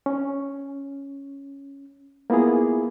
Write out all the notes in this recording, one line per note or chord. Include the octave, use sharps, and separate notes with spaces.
C#4
A#3 B3 E4 F4 G#4